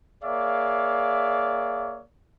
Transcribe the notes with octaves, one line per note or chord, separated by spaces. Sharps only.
A#3 G#4 C#5 D5 E5 F5